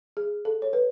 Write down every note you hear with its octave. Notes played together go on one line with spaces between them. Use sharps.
G#4
A4
C#5
B4